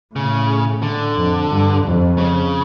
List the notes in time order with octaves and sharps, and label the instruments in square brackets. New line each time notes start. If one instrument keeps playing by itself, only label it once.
[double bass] A2 [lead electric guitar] C#3
[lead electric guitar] D3
[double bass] F2
G2
F2
[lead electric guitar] C#3